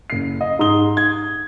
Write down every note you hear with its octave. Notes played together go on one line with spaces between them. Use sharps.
F#1 C7
D#5
G#2 D#4 C6 D#6 G7
G#6